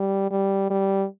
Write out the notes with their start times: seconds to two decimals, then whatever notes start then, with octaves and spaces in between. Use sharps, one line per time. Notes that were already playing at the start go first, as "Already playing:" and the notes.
Already playing: G3
0.31 G3
0.70 G3